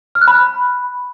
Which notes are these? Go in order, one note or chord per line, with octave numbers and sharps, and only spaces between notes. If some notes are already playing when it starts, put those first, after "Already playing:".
F6
F#6
B5